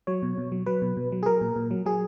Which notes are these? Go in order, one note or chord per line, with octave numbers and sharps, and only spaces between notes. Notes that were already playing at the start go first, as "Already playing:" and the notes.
F#3 C#5
B2
B2
F#3
F#3 B4
B2
B2
F#3
G#4
F#3 A#4
A#2
A#2
F#3
F#3 G#4